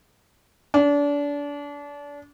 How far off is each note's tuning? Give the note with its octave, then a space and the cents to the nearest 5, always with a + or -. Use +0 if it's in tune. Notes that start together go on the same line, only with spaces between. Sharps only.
D4 -30